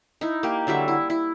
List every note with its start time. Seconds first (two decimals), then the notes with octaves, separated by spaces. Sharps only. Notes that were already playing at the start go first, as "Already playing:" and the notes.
0.21 D#4 E4
0.43 A#3 G4
0.67 D3 F#3 G3 E5
0.88 E4
1.10 E4